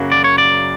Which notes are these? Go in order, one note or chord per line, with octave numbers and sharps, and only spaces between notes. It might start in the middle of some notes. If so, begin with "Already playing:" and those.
Already playing: F#2 C#3 F#3 A#3
D5
C#5
D5